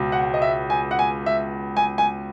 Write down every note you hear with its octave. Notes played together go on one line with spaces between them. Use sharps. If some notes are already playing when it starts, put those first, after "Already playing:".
Already playing: C#2 B2
F#5
D#5
E5
G#5
F#5
G#5
E5
G#5
G#5